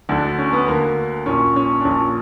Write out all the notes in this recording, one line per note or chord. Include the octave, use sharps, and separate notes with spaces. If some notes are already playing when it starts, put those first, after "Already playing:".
D2 D3 D4
C#4
B3
D2 D3 A#3
A#1 A#2 C#4
C#4
D4
A#1 A#2 C#4